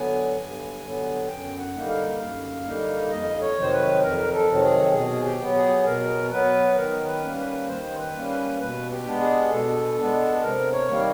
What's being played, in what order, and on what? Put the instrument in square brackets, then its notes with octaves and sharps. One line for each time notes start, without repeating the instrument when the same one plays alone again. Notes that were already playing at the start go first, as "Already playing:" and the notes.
Already playing: [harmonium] D3 F#3 B3 G#5
G2
D3 F#3 B3
F#2 G5
F#5
D3 G3 A#3 D#4
F5
F#2
D3 G3 A#3 D#4
F2 D#5
C#5
C3 D#3 F#3 C5
B4
F2 A#4
A4
C3 D#3 F#3
G#4
B2 G#4
G4
F#3 B3
G#4
B2 A#4
F#3 B3 B4
D#3 A#4
B4
G3 A#3 C#4
B4
D#3 C5
B4
G3 A#3 C#4
B4
B2 B4
G4
G#3 B3 D4
G#4
B2 A4
G#3 B3 D4
C3 A#4
C#5
D#3 G3 A#3